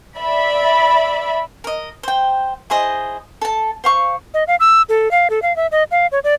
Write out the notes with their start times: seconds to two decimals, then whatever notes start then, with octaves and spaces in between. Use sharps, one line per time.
0.19 D5 E5 B5
1.64 A#4 D#5
2.03 C5 G5
2.70 E4 G#4 C5 D#5
3.41 A4 A5
3.84 C5 F5 C#6
4.34 D#5
4.47 F5
4.60 E6
4.89 A4
5.11 F5
5.30 A4
5.42 F5
5.56 E5
5.72 D#5
5.91 F5
6.12 C#5
6.24 D5